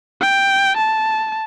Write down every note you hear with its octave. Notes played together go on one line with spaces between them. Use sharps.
G5
A5